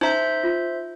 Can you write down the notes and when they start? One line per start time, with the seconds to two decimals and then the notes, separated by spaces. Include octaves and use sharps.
0.01 D#4 C5 E5 A#5 G6
0.43 F4